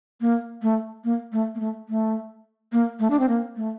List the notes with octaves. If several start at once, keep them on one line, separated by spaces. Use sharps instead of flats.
A#3
A3
A#3
A3
A#3
A3
A3
A#3
A3
D4
C4
A#3
A3